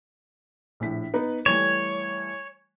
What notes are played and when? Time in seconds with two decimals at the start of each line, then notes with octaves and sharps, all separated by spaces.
0.80 A#1 A2 B6
1.14 B3 D#4 B4
1.46 E3 G3 A3 C#5